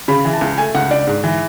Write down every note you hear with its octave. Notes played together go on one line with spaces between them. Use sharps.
C#3 B5
E3
A5
C#2
A3 G#5
C#2 F#5
D4 D5
G#2
E3